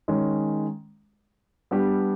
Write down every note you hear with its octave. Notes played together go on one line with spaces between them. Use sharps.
D#3 G#3 C#4
G3 B3 D4 G4